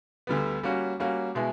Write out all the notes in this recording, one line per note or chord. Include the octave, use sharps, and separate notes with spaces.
D2 D3 G3 B3
G3 A#3 C#4 F#4
G3 A#3 C#4 F#4
B2 G#3 B3 E4